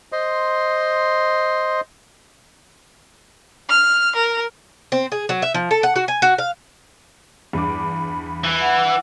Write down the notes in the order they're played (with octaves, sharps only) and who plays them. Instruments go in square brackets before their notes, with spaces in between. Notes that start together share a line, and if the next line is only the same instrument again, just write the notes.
[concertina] C5 D#5 C6
[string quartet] F6
A#4
[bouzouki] C4
G#4
F#3
E5
F3
A4
F#5
F#4
G#5
F#4
F5
[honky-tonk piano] E2 G2 D6 [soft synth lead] B5
[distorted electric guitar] E3
[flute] F#5